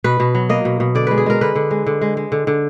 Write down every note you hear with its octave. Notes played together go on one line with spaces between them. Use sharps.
B2 B4
B2
F#3
A#3 D#5
B2
B2
D3 D5
G#3 B4
G#4
G#3 A#4
D3 B4
D3
G#3
D3
G#3
G#3
D3
D3